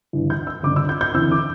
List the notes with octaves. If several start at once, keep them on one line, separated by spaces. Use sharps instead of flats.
G1 G2 E3
G6
E6
G1 G2 D3 D6
E6
G6
G6
E2 D3 C4 E4 E6
D6